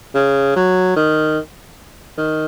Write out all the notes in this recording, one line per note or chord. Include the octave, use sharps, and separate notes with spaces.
C#3
F#3
D#3
D#3